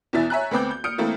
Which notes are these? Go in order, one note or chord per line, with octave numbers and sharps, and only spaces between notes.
E2 B2 E3 E5 A6
C#5 E5 G#5 A#5 F#6
D2 B3 C4 D6 G6
G6
D#6 F6 G6 C#7 D7
E3 A3 A#3 C4 E4